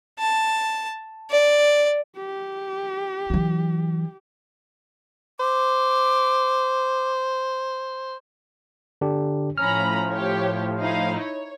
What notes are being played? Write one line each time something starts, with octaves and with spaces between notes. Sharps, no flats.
A5
D5
G4
E3 F#3
C5 D6
D3 D4 G4
A2 F3 C#4 A#5 B5 F6
G4 C#5
D#4 E4 F5
C#5